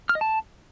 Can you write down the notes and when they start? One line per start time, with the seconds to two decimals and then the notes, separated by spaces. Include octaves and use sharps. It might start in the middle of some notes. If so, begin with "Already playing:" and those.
0.09 F6
0.15 D#5
0.21 A5